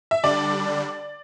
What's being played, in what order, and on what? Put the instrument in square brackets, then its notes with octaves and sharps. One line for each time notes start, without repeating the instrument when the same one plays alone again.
[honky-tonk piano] E5
[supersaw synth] D3 G3 D4 [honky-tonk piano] D5